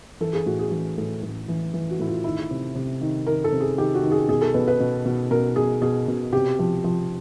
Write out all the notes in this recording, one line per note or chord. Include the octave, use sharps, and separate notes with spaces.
E3 A4
G#4
A2 F#4
G#4
E3 G#4
A2
A2
E3
E3
F#4
A2 E4
F4
D#3 E4
C3
C3
D#3
D#3 A#4
A4
C3
G#4
D#3 G4
F#4
D#3
G#4
B2 G#4
A4
B2 B4
B4
B2
B2
B2 A#4
B2 G#4
B2 G#4
B2
C3 G4
F3
F3